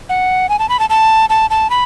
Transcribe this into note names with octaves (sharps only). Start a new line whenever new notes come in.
F#5
G#5
A5
B5
A5
A5
A5
A5
B5